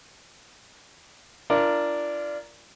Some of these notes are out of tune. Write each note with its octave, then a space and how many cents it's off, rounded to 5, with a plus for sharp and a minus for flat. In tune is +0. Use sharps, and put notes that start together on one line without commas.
D4 +0 F4 -40 A#4 +0